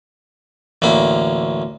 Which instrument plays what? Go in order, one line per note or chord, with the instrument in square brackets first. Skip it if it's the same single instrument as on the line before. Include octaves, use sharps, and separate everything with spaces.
[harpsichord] A1 D2 A#3 B5